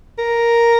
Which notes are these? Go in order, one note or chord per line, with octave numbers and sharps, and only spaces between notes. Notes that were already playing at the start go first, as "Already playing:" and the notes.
A#4